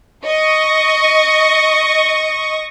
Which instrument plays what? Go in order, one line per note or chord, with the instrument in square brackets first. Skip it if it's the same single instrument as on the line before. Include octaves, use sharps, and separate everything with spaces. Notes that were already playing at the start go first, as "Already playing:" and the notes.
[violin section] D#5 C#6